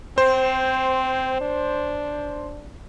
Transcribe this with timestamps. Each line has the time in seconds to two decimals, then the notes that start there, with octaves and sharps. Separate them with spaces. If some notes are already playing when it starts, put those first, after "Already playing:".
0.18 C4 C5
1.41 D4